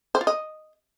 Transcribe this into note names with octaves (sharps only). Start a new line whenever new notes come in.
C5
F4
D#5